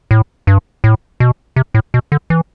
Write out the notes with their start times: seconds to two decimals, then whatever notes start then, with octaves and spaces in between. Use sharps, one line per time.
0.11 A2
0.47 G2
0.84 A2
1.20 B2
1.56 C3
1.74 A2
1.94 B2
2.12 D3
2.30 E3